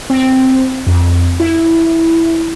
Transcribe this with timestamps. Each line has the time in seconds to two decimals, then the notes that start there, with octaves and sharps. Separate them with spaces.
0.10 C4
0.87 F2
1.40 E4